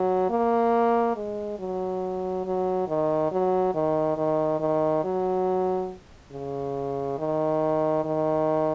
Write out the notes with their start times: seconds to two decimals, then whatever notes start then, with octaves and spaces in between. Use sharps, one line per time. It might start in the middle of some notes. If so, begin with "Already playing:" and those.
Already playing: F#3
0.30 A#3
1.16 G#3
1.59 F#3
2.45 F#3
2.88 D#3
3.31 F#3
3.74 D#3
4.17 D#3
4.60 D#3
5.04 F#3
6.32 C#3
7.18 D#3
8.04 D#3